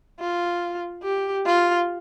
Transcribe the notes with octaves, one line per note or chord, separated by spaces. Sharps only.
F4
G4
F4